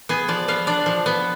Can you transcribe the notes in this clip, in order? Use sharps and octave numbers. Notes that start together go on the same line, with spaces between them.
B3 G#4
F3 D5
B3 F5
D4 D5
F3
B3